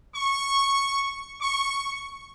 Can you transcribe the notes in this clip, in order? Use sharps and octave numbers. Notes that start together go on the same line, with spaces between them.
C#6
C#6